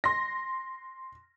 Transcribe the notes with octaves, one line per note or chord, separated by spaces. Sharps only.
C6 A#6